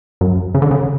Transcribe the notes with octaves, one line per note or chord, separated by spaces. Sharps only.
F#2
C#3
D3
C#3